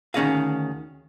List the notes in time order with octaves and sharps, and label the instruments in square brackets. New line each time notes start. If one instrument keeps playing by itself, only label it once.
[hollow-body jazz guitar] D2 D#3 C#4 G#4 D#5 F5